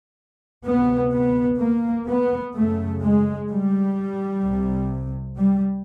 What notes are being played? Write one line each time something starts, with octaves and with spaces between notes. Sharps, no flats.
D2 C3 B3
B3
A#3
B3
F#2 C#3 A3
G#3
G3
C2 C3
G3